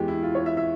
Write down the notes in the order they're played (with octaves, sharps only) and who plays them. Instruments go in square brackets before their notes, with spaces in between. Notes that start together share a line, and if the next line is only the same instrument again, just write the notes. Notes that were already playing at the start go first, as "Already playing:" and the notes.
Already playing: [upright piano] E2 E3 G#3 G4
E4
F4
C#5
E5
E5